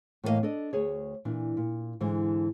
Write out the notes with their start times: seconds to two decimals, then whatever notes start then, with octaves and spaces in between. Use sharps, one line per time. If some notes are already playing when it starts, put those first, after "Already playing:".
0.23 A2 E3 A#3 A4 D#5 F5
0.43 D4 A4 D5 D#5
0.73 D2 G#4 C#5
1.25 A#2 E3 D4
1.57 A#2
2.00 G#2 D3 E3